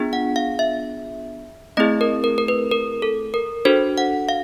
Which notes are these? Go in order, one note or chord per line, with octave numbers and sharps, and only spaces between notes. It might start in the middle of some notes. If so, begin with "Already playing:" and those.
Already playing: B3 D4 F4 G#4
F#5
F5
E5
A3 C4 E4 G#4 D#5
A#4
A#4
A#4
B4
A#4
A4
A#4
D4 F#4 A4 C5
F#5
F5